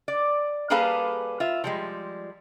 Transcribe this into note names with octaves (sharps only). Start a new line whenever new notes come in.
D5
G3 A#3 G#4 A4 B4 F5
F4 E5
F3 G3 G#3